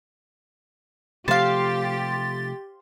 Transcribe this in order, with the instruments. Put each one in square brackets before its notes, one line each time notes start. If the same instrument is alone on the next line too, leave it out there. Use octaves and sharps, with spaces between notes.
[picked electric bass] C3 F3 A3 [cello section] G4 [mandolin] C5 F5 [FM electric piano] C6 A6